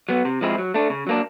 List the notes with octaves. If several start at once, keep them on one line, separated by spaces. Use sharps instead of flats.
F#3 B3
C3
F3 G#3 C4 E4
F#3
A3 D4
C#3
F#3 A#3 D4